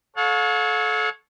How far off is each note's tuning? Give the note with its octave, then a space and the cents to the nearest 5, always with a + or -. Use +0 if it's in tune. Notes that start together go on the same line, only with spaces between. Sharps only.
A4 -25 C#5 +0 F5 +45